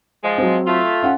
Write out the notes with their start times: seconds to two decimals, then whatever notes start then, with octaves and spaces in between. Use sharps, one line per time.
0.24 F3 G#3
0.38 F#3 C4
0.67 A3 F4
1.03 C#4 F5 F#5